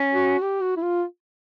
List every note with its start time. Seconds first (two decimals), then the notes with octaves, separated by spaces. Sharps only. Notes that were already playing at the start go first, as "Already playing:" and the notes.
Already playing: C#4
0.12 F#4
0.42 G4
0.62 F#4
0.76 E4
0.82 F4